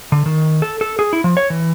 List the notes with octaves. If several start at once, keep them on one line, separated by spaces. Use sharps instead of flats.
D3
D#3
A4
A4
G#4
E4
F3
C#5
E3